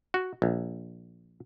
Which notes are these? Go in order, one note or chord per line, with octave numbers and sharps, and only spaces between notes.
F#4
A#1